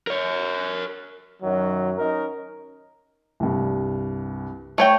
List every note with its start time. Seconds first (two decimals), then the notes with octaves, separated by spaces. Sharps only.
0.07 A#4 C#5
1.43 F#2 D#3 F#3
1.99 C#4 D#4 A#4
3.40 C2 G2
4.78 A3 C#5 G5